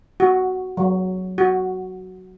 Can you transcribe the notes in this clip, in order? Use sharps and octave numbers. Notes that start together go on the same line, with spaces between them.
F#4
F#3
F#4